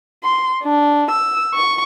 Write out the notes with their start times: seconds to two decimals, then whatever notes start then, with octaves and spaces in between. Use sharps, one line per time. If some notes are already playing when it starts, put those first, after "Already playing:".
0.23 C6
0.64 D4
1.11 E6
1.54 C#6